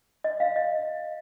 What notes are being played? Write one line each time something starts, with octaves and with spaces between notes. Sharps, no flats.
D#5
F5
D#5